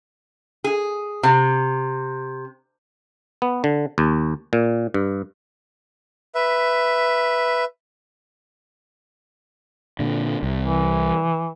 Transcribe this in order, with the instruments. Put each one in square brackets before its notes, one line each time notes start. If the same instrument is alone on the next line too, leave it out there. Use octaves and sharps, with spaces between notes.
[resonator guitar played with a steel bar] G#4
C3
[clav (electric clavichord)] B3
D3
D#2
A#2
G2
[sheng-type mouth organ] B4 E5
[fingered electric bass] A#2 D3
C2
[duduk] E3